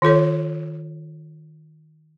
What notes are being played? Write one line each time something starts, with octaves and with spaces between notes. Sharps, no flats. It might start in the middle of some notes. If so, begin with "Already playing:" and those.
D#3 F4 A4 C#5